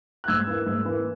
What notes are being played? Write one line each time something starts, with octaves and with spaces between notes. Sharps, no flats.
F#6
G#2 E6 G#6
E3 A#3
G#2
E3 A#3